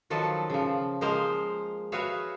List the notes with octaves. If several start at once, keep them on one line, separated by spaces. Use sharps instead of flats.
D#3 F3 F#3 A4 B4 A5
C#3 F3
F3 G#3 A#3 A#4 C5 F5
F#4 G#4 B4 C#5 E5 F5